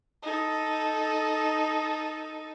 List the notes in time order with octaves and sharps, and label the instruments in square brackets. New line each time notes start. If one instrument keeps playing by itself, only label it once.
[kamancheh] D#4 A4